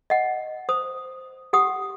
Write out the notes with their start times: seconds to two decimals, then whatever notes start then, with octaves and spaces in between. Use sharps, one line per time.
0.10 D#5 F#5
0.69 C5 D#6
1.53 G4 F#5 D#6